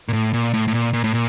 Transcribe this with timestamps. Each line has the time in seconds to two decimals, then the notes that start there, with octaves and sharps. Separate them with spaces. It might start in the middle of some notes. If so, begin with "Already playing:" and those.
0.09 A#2
0.13 A2
0.33 A#2
0.54 A2
0.68 A2
0.74 A#2
0.93 A#2
1.04 A2
1.14 A#2